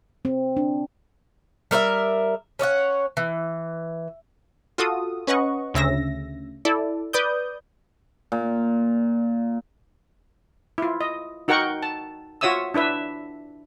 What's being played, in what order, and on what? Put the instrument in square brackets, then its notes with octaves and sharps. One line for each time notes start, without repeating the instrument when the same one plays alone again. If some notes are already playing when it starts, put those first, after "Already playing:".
[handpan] C4
D4
[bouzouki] G3 A#4 C5 E5
C#4 C#5 D5 F#5
E3
[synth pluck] F4 F#4 A4 D#6
C#4 B4 D#5 F#5 C#6
D2 C#3 E5 A#6
E4 A4 D5
B4 D5 D#6 G6
[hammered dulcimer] A#2
[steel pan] E4 F4
D#5
D#4 F#4 A#4 F#5 G5 C#6
A5
F4 F#4 C#5 E5 D#6 E6
D4 E4 B4 E5